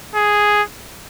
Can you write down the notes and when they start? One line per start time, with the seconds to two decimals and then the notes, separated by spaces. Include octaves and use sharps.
0.15 G#4